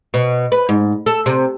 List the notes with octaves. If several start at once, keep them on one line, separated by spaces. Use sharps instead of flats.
B2
B4
G#2
A4
C3